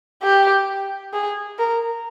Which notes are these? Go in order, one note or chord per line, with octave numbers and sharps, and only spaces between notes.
G4
G#4
A#4